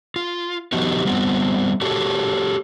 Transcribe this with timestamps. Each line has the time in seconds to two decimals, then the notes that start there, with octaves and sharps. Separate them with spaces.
0.16 F4
0.72 F3 B3 D#4 F#4 G4
1.05 G3 B3 C4 F4
1.81 F#4 G4 A4 C#5